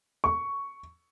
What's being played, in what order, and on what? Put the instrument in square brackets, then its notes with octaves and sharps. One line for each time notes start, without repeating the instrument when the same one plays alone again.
[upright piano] C#6